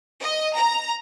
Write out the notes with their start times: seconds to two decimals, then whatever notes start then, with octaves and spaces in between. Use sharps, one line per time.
0.22 D#5
0.56 A#5